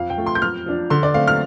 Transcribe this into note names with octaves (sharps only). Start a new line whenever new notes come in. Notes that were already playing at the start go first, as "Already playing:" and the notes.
Already playing: F2 F5
G5
F3 A3
C6
G6
F2 F6
F3 D4
D3 C6
D5
A3 C4 F5
F6